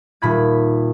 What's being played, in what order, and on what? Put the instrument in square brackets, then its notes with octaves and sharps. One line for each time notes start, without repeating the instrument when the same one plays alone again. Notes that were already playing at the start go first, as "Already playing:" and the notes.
[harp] D#1 A#2 B5 G#6